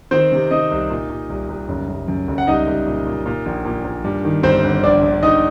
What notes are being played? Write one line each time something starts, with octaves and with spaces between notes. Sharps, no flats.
D#3 C4 C5
C3
C3 D#4 D#5
C2
A#2
A#2
C2
C2
F#1
F#1
F#2
F#1
F#5
C2 D#4 D#5
C2
A#2
A#2
A#2
A#1
A#2
A#2
G2
D#3
G1 C4 C5
G1
A#1 D4 D5
A#1
A#1 D#4 D#5